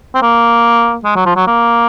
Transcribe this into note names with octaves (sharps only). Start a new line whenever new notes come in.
C4
A#3
G#3
F#3
F3
F#3
A#3